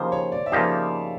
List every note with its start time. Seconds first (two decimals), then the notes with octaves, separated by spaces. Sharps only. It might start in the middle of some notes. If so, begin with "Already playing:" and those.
Already playing: C#3 F3 A#3 D#4 G4 C5
0.12 C#5
0.32 D5
0.46 E5
0.52 C#3 F3 A#3 D#4 G4 F5